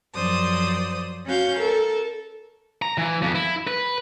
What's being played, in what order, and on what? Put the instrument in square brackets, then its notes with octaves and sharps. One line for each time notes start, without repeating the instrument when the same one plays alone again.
[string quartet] F#2 F3 C5 D5 D#6
C#4 F#4 F5 G6
A4 A#4
[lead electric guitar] A#5
E3
F2
E4
B4